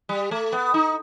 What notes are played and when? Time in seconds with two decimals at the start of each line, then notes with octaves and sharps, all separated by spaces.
0.09 G3
0.31 A3
0.52 B3
0.74 D#4